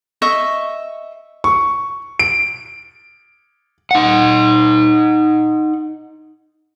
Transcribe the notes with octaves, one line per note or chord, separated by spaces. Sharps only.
D#5 E5 C#6
C#6
D7
D#4 F#5